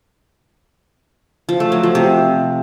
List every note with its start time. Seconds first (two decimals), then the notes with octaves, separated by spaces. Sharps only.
1.49 F3
1.60 A3
1.72 F#3
1.83 F3
1.95 C3